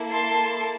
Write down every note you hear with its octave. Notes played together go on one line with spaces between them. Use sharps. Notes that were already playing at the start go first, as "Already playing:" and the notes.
Already playing: A#3 E4 A4
A5 C6